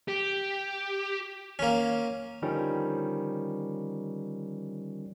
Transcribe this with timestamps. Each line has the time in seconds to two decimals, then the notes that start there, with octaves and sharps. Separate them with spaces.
0.08 G4
1.59 A#3 C#4
2.42 D3 D#3 F3 G3 C#4